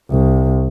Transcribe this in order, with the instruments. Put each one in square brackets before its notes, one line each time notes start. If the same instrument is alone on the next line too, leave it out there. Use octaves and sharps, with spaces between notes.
[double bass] C2